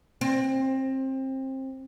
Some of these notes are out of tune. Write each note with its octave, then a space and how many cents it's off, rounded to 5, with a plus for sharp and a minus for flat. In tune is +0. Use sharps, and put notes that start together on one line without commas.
C4 +25